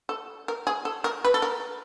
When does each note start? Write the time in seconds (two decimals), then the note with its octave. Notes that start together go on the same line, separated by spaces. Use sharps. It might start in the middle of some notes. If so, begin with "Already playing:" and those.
0.09 A4
0.48 A#4
0.67 G#4
0.85 A4
1.04 A#4
1.25 B4
1.34 A4
1.42 A#4